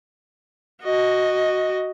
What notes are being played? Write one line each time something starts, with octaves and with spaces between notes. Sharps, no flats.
F#4 D#5